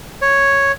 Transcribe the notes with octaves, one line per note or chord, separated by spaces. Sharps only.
C#5